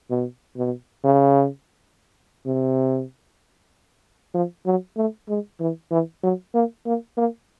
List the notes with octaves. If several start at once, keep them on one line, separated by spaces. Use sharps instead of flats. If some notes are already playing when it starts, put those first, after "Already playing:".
B2
B2
C#3
C3
F3
F#3
A3
G#3
E3
E3
F#3
A#3
A#3
A#3